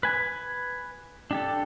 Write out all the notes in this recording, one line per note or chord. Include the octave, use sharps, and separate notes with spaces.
B4 G#5
D4 G4 A4